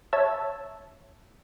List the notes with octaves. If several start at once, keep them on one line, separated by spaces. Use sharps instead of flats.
C#5 E5 A5 E6 G#6